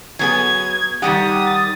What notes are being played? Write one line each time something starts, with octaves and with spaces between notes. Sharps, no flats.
F#3 B3 G#4 G#6
D#3 G3 G4 F#5 D#6
A6